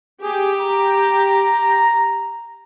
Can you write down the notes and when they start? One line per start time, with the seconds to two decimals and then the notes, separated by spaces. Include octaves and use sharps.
0.23 G4 G#4
0.61 A#5